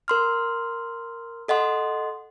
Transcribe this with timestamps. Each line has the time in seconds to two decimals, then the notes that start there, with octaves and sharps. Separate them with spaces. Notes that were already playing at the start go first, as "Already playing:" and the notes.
0.08 A#4 C6 F6
1.48 A4 D#5 F#5 C6